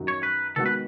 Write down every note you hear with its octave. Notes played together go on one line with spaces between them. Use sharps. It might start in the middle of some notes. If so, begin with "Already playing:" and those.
Already playing: F#2 D#3 F#3
C#5
B4
D#3 G#3 B3 F#4 A4
B4